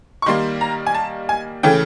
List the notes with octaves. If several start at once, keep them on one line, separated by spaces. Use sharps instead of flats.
C#6
D#3 G3 A#3 C6
A#5
G#5
A5
G#5
C#3 E3 A3 G5